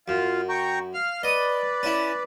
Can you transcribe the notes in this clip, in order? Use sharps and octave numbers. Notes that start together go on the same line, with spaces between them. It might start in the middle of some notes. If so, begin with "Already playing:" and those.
F#2 F4
G5 A#5 C#6
F5 F6
B4 D5 D#5 D#6
C#4 E4